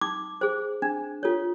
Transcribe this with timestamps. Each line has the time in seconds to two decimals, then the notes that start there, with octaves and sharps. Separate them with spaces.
0.01 D#4 D6
0.41 G#4 C5
0.82 D4
1.23 F4 A4 C#5